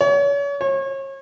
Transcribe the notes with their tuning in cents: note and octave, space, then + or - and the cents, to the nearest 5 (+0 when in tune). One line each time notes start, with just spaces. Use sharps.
C#5 +35
C#5 -35